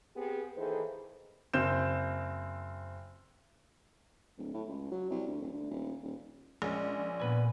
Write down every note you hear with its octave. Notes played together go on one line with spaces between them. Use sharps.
B3 C4 G4 G#4
D#2 D#3 E3 G#4 A4 C5
F#1 C4 G6 E7
D1
A2
C#2
F#3
C2
D2
D#1
D2
D#1
D#1
A#1 G#3 C#4
A#2 B3 B4 G#5